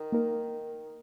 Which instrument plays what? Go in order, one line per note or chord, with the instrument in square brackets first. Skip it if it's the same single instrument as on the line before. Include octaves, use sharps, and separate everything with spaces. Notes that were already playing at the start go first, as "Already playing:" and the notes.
Already playing: [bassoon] D#3
[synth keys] A#3 D#4 A#4